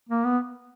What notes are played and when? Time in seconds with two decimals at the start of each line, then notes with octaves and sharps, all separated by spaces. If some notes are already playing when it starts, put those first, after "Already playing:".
0.09 A#3
0.24 B3